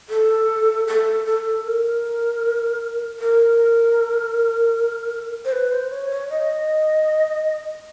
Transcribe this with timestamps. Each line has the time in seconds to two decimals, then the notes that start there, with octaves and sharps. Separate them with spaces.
0.10 A4
0.87 A4
1.26 A4
1.65 A#4
3.19 A#4
5.45 C5
5.52 B4
5.72 C5
5.91 C#5
6.10 C#5
6.30 D#5